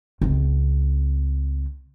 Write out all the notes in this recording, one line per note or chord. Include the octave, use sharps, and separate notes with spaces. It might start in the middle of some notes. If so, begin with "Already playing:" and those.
C#2 C4